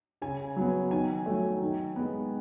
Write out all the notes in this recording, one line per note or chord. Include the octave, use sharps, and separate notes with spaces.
C#3 G#5
F#3 B3
D#3 G#5
F#3 A3
D#3
G#3 B3